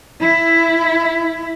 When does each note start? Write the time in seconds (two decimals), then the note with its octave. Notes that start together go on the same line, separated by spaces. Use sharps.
0.21 E4